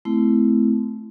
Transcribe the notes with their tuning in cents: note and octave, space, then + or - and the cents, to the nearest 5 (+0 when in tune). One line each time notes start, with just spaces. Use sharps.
A3 -20 C4 -30 E4 +10